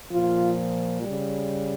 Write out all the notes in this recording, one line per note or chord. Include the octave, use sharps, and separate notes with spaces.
A#2 F3 F4
C#3 G3